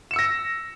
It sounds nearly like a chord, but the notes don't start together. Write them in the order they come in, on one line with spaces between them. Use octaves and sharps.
E7 C#7 E6 A#6